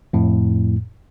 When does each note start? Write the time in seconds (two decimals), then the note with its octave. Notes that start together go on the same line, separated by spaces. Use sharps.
0.13 F2 A2